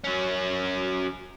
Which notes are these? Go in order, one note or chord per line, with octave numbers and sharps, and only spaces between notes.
F#3 C#4